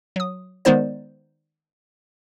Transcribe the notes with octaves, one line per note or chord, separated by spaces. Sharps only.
F#3 D#6
D#3 G#3 B3 D#4 C5 D5